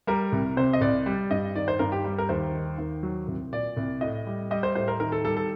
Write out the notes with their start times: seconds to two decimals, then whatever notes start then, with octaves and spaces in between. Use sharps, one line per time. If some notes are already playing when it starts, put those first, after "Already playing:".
0.07 G3 A#4
0.32 C2
0.57 C3 C5
0.73 D#5
0.81 C2 D5
1.06 G3
1.31 G2 D#5
1.55 D#3 D5
1.68 C5
1.79 G2 A#4
1.92 G4
2.04 G3
2.18 A#4
2.29 D#2 C5
2.53 D#3
2.78 D#2
3.03 F#3
3.27 C2
3.52 A#2 D5
3.77 C2
4.01 A2 D#5
4.27 G3
4.51 G3 D#5
4.63 C5
4.75 A2 C5
4.88 A#4
5.00 D#3 A#4
5.12 A4
5.25 G3 A4
5.37 A4